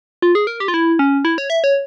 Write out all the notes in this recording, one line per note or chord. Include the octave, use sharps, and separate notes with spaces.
F4
G#4
A#4
G4
F4
E4
C#4
E4
C#5
E5
C#5